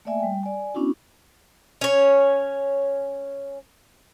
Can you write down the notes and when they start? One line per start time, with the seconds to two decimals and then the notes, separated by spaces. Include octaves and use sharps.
0.05 A3 A#3 D5 E5 G#5
0.20 G3 G5
0.43 D5 G#5
0.74 B3 C#4 D4 E4 F#4
1.81 C#4 C#5